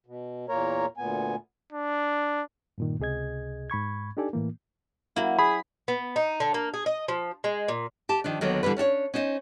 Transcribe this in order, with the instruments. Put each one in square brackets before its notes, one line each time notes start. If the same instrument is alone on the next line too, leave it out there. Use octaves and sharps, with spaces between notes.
[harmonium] B2
E2 A#2 A#3 A#4 C#5 A#5
D2 A#2 B3 G#5
[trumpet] D4
[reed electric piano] G2 A#2 D#3
C#2 C3 G#4 D#5 G#6
G#2 B5 C#6 G#6
D4 D#4 G4 A4 D5 G#5
A2 E3 A#3
[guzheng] F#3 E4 [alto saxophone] A#3
[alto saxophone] G#4 [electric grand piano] B5
[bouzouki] B3
D#4
D3
A#3
G#4
D#5
F3
G#3
A#2
[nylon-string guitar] G4 A5
D#3 F3 D4
D#2 D3 D#3 F#3 A#3 B3
D3 E3 G3 B4
C#4 D4 F#4 C#5
C#4 D#4 C5 C#5 D#5